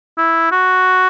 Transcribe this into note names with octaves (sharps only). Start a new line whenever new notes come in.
E4
F#4